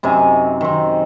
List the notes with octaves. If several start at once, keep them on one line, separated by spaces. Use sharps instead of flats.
F#2 C3 D#4 G#5
D#3 C4